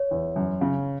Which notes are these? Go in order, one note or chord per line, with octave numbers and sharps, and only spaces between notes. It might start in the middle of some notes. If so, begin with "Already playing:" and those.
Already playing: C#5
E2
F#2
C#3